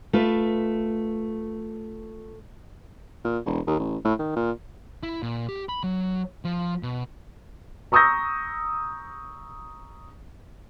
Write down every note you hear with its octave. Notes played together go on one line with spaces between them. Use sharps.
A3 F4 B4
A#2
E1
D#2
A1
A2
D#3
A#2
E4
A#2
G4
B5
F#3
F3
B2
A#5 C#6 D#6 E6 G6 A#6